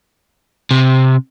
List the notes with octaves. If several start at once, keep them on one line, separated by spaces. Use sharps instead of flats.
C3